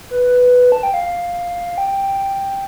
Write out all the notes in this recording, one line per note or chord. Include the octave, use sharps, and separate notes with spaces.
B4
A5
G5
F5
G5